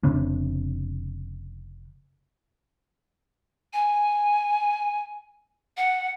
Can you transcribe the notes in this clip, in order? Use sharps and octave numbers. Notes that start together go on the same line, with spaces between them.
F1 C#3 C4 D4
G#5
F#5